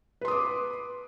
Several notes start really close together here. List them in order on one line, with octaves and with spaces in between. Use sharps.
B4 C6 D#6 D6